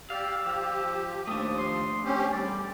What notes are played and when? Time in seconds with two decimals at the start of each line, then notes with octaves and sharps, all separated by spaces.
0.10 G4 D5 F5 E6
0.44 F3 G4
1.27 D#2 F3 A3 D4 D#6
1.59 C6
2.04 C4 C#4 G4
2.32 E2 G3 D5